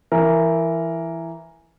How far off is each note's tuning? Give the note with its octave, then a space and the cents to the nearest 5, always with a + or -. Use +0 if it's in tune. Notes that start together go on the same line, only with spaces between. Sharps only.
E3 +10 A#4 +0